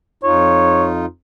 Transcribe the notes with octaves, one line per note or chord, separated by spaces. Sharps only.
F2 D#4 F4 C#5